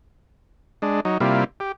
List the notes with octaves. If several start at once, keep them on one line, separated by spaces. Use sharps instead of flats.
G#3 D4
F#3 D#4
C3 G3 A#3 E4 F4
G4